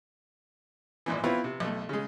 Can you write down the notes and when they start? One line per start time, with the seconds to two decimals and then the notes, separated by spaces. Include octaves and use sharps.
1.06 G#1 A#2 E3
1.24 B3 C4 E4 F4 B4 C#5
1.44 C3
1.60 B1 A3
1.89 C#3 G#3